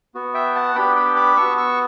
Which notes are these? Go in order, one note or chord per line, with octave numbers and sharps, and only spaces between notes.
B3 F#4
E5 G5
F#5 A5
B3 D4 G4 G5 B5
G5 B5
B5 D6
B3 F#4 C#6 E6
C#6 E6